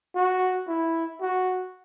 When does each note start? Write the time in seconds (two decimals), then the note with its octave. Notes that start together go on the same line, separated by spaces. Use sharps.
0.15 F#4
0.68 E4
1.21 F#4